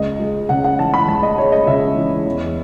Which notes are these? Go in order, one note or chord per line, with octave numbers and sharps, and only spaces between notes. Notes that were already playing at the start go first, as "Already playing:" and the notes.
Already playing: C#2 D#5
G#3
C#3 F#5
F#5
E3 A5
B5
C#2 A5
D#5
G#3 C#5
D#5
C#3 E5
E3
E2